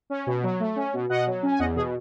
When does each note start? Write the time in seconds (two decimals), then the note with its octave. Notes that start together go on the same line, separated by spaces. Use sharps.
0.10 C#4
0.27 B2
0.43 F#3
0.60 A3
0.76 C#4
0.93 B2
1.09 B2 D#5 F#5
1.27 F#3
1.43 C#4
1.51 G#5
1.59 E2 D#5 F#5
1.76 B2 G#4